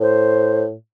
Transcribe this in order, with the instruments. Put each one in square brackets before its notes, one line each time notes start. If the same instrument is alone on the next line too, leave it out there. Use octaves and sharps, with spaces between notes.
[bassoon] A2 [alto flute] C5